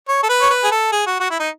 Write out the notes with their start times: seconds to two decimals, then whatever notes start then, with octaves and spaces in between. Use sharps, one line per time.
0.08 C#5
0.23 A4
0.29 B4
0.41 C#5
0.50 B4
0.64 G#4
0.71 A4
0.92 G#4
1.06 F#4
1.20 F#4
1.30 E4
1.39 D#4